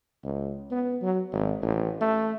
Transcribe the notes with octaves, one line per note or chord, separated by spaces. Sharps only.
C#2
B3
F#3
G#1
A1
A3